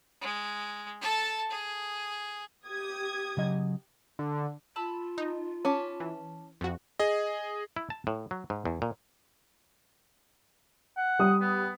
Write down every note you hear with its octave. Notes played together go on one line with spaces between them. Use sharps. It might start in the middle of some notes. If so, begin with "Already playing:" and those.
G#3
A4 A5
G#4
G4 D#6 G#6
C#3 F#3 D#5
D3
F4 A5 B5 E6
D#4
C#4 A5 B5 D6
E3
F2 F#4
G#4 D#5
E4
A5
A2
F#3
G#2
E2
A#2
F#5
G3 D#6
B3